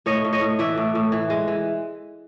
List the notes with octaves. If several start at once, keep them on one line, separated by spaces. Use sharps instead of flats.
A2 C#5 D#5
A2
C#5 D#5
A2
E3 D5 E5
A2
A2
E3
G#3
E3